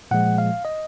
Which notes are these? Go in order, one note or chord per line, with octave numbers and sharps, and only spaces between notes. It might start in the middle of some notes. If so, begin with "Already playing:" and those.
A#2 F3 G#3 F#5
F5
D#5